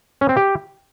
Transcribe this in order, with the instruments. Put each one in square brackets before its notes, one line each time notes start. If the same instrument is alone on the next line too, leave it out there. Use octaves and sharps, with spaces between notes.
[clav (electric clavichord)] C#4
C4
G4